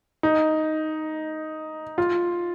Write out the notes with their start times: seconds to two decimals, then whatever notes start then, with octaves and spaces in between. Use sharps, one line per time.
0.23 D#4
1.98 F4